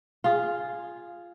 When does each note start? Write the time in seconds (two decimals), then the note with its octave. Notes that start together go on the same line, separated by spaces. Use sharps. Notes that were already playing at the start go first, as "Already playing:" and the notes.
0.24 F4 G#4